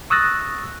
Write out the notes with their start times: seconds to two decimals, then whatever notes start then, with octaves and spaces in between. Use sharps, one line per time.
0.10 C#6 D#6 E6 F#6 A6 A#6